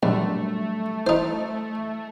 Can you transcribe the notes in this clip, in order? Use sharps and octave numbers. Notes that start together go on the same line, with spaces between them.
A#1 F#3 G3 A3 D4
D#4 E4 C5